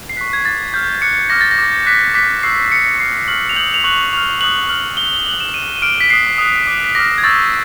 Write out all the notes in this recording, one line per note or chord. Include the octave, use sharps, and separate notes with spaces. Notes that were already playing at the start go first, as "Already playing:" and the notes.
C7
C#6 F#6 B6
G#6
D6 F#6 A6
C#6 F6 G6
D6 F#6 C#7
D6 F6 A#6
A6
A#6
D6 G6
D6 F#6 B6
D6 F#6 B6
C#6 E6 G6 C7
D#6 G6 C#7
C#6 F6 C7
C#6 F6 F#7
F7
D#6 G6 F#7
F7
C#6 F#6 F#7
C#6 F6 F7
D#6 F#6 F#7
C#6 F6 F#7
C#6 F#6 G7
G7
D6 F#6 F#7
E7
D6 F#6 D#7
D#7
D6 F6 D7
B6
D#6 F#6 C7
D#6 F#6
D6 F#6
B6
D6 F6 A#6
G#6
C#6 E6 G6 A6